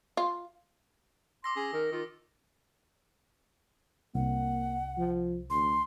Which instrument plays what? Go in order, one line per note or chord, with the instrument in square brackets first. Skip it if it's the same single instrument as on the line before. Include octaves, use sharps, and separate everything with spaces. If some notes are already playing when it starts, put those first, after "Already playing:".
[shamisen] F4
[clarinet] C6 [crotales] D6 E6 A#6
[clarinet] C#4 [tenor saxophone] G#4
[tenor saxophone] D#3 [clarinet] A#4
[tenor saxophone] D#3 [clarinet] F4
[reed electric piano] C2 [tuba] A#3 [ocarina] F#5
[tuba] F3
[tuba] D2 [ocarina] C6